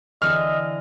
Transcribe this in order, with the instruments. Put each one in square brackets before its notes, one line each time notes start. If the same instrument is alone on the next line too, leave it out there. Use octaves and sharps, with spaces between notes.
[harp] D3 E3 E6 [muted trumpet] D#5 [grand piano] F6